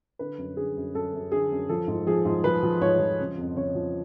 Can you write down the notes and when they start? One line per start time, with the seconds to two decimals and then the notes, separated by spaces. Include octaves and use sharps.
0.19 D3 B4
0.38 F#2
0.57 D3 G#4
0.77 F#2
0.94 F#2 A4
1.14 F#2
1.32 D3 G#4
1.51 F#2
1.69 F3 A4
1.88 G#2
2.07 F3 G#4
2.25 G#2
2.44 F3 B4
2.63 F3
2.81 G#2 C#5
3.00 F3
3.20 C#3
3.38 F2
3.56 C#3 C#5
3.75 F3